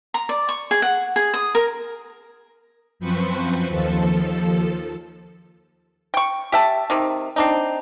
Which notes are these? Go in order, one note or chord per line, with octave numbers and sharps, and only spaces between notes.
A#5
D5
C#6
G#4
F#5
G#4
D#6
A#4
F#2 F3 C4 B4 C5 C#6
D#2 F3 A4
G5 C#6
G4 E5 A5
C3 D#3
C4 D4 D#4